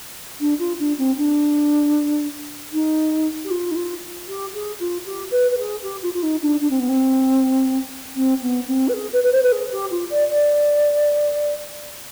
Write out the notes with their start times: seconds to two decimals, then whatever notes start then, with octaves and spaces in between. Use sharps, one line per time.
0.40 D4
0.59 F4
0.79 D4
0.98 C4
1.17 D4
2.73 D#4
3.44 G4
3.50 F4
3.71 D#4
3.75 F4
4.28 G4
4.54 G#4
4.79 F4
5.05 G4
5.31 B4
5.51 B4
5.58 G#4
5.83 G4
6.02 F4
6.13 F4
6.22 D#4
6.42 D4
6.60 D4
6.70 C4
6.79 B3
6.88 C4
8.16 C4
8.42 B3
8.67 C4
8.88 B4
8.93 G#4
9.13 B4
9.23 B4
9.32 C5
9.42 B4
9.52 G#4
9.72 G4
9.91 F4
10.10 D5
10.30 D5